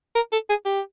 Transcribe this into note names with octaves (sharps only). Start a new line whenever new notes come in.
A#4
A4
G#4
G4